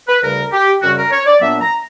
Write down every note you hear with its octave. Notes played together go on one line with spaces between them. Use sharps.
B4
D2 C#3 G3 A#4
G4
F#2 C#3 G3 C#4 F#4
A#4
C#5
D5
A#2 F#3 B3 D4 E5
A#5